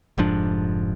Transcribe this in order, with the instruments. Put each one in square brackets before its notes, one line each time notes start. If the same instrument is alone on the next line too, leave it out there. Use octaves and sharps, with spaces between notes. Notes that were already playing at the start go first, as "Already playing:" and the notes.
[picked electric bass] F1 G#2 F3 D4